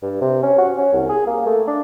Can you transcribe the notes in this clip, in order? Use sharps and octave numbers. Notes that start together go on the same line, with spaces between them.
G2
C3
C#4
F#4
C#4
C2
G#4
A#3
A3
D4